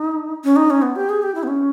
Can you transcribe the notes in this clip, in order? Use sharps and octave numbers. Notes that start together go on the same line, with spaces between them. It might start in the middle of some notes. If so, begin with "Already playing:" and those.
Already playing: D#4
C#4
D#4
C#4
B3
G4
G#4
G4
E4
B3
C#4